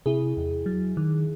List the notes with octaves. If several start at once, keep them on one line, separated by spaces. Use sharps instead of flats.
C3 E4 G#4
E2
F#3
D#3